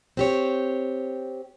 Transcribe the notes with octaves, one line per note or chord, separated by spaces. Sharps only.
C4 G4 C#5